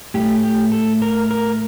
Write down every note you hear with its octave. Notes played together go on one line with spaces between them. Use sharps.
A2 A3 G4
G4
A4
A#4
A#4